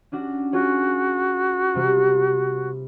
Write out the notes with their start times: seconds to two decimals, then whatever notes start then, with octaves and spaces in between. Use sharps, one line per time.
0.12 C#4 D4 F#4
0.53 F4 F#4 G#4 C#5
1.75 C3 G3 C4